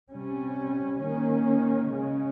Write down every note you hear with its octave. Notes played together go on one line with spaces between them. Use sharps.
C3 G3 C#4
D#3 A#3 C#4
C#3 G#3 C#4